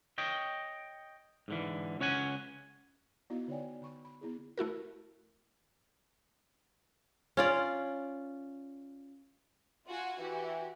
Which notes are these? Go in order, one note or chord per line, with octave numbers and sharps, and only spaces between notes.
C#5 D#5 G5
G#2 D3 E3
C#2 C#4 C#5 F#5 G#5
B3 D#4 E4 F#4 D#5 F5
D3 D#4 C#5 D5 G5 G#5
D3 B5 C#6
B5
B3 E4 G#4
A3 E4 F#4 A#4
C#4 F4 D5
F4 F#4 G#5
E3 F#4 G4